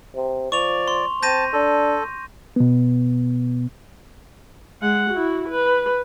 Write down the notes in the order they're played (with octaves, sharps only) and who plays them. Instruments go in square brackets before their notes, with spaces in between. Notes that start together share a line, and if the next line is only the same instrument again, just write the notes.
[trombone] C3
[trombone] F3 [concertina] D5 [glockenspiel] C#6 F7
[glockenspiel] C6
[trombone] C4 [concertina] A5 [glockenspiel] G6 A#6 D#7
[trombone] D4 [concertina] A4
[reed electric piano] B2 B3
[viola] G#3 F#5
E4 F#4
B4